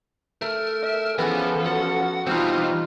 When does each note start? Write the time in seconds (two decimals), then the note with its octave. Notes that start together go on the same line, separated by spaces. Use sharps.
0.42 A3 A#4
0.83 E5
1.18 E3 F3 B3 C#4 G#4 A4
1.66 F#4 F#5
2.27 B2 E3 G3 C4 D#4 F4